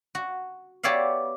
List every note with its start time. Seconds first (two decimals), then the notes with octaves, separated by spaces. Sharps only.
0.15 F#4
0.83 B3 G4 C#5 D5 E5 F5